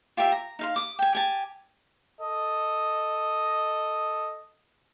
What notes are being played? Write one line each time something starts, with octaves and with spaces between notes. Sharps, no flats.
F4 G4 A#4 E5
A#5
D#4 F5 C6
D6 D#6
G5 G#5
G4 G#5 A5
A4 D#5